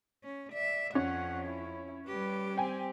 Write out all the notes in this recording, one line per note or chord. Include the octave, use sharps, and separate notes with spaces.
C#4
D5 E5
F2 C#4 F#5
E4
G3 G4 B4
C4 G5 G#5